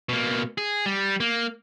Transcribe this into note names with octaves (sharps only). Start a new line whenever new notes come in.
B2 A#3
G#4
G3
A#3